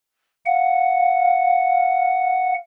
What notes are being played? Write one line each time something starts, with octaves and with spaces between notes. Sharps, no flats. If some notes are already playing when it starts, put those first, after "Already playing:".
F5 F#5